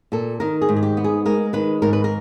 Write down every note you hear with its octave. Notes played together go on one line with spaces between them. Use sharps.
A#2 A4
D#3 A#4
G#4
G#2
G#4
G4
B3
G#4
G#3 A#4
D#3 B4
G#2 A#4
B4
A#4